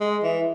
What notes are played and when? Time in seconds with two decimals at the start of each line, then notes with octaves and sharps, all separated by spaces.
0.01 G#3
0.23 E3